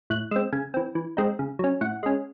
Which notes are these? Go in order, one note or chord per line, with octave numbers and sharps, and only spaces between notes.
A2 F#6
G#3 C4 E6
C#3 G#5
E3 C4
E3
G#3 C4 D#4
C#3
F#3 C#4
A2 F#5
G#3 C#4